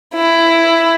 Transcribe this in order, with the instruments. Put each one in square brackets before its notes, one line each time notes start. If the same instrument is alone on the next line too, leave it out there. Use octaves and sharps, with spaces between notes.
[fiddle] E4